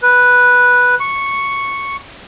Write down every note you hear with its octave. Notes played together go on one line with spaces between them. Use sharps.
B4
C#6